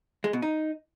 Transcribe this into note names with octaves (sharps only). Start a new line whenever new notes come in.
G#3
B2
D#4